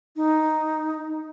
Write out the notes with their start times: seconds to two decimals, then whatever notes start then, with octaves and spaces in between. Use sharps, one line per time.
0.16 D#4